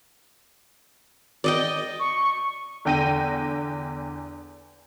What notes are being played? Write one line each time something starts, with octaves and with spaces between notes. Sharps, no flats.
D5 D#5 G5
C#6
E2 D3 G5 A#6 D#7